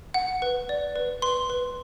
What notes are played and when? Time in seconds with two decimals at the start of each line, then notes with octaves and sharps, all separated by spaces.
0.14 F#5
0.42 B4
0.69 D5
0.96 B4
1.22 B4 C6
1.50 B4